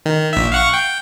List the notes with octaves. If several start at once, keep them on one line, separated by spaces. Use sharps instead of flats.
D#3
A#1 E5
F5 F#5 C#6
G5